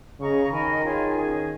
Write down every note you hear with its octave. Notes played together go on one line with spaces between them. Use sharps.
C#3 G#4 D#5 A#5 C#6
D#3 A#4 D#5 G#5 B5
F4 G#4 C#5 G#5
C#4 G#4 D#5